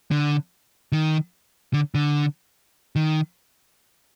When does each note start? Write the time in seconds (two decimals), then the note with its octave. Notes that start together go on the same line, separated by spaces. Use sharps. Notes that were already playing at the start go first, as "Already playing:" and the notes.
0.11 D3
0.92 D#3
1.73 D3
1.95 D3
2.96 D#3